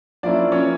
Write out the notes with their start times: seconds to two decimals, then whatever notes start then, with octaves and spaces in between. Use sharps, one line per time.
0.23 F3 A#3 C#4 D4 E4 D5
0.52 C#4 C#5